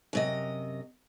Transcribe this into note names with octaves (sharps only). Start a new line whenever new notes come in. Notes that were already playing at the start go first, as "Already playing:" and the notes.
F#2 C3 D#5